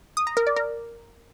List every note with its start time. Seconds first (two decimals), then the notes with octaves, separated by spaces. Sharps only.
0.17 D#6
0.27 A#5
0.37 A#4
0.47 D5
0.56 A#4